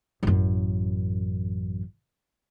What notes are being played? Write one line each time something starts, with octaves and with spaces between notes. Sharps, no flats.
A1 F#2